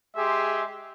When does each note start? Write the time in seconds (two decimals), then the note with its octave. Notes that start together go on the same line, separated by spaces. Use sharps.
0.16 G#3 G4 G#4 E5 C6